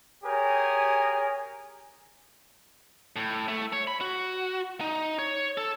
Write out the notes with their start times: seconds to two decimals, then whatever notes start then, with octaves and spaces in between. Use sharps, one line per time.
0.24 G4 G#4 A#4 C#5 G#5
3.16 A2
3.48 A3
3.73 C#5
3.87 B5
4.01 F#4
4.81 D#4
5.19 C#5
5.58 A4